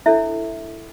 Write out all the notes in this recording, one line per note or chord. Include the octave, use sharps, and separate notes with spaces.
D4 E4 A4 C#5 E5